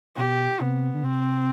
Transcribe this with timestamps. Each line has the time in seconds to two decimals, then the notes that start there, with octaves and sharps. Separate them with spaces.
0.17 B2 G4
0.60 C3 B3
0.94 D3
1.03 C3 C4